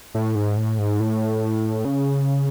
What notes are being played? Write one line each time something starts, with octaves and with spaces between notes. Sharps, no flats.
A2
G#2
A2
G#2
A2
C#3